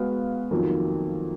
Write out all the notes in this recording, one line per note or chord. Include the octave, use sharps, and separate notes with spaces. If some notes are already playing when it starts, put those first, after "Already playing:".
Already playing: G#3 B3 F#4 B4 F5
F2 D#3 F#3 A#3